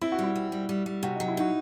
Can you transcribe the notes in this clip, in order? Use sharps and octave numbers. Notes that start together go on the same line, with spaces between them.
C4 E4
F#4
G3 E4
C4
G3
G3
G3
C3 F#4
D#4
F#3
E4
D#4 F#4